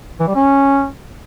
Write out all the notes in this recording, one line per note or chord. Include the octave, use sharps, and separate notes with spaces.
E3
G3
C#4